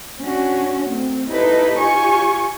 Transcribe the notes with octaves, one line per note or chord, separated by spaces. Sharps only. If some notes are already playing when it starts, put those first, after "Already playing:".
C#4 D4 F#4
A3 C4
D#4 E4 G4 A4 B4
F4 G4 G#5 C#6